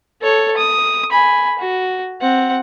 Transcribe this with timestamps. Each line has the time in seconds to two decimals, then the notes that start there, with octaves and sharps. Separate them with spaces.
0.21 A4 C#5
0.57 D#6
1.11 G#5 B5
1.59 F#4
2.21 C4 F#5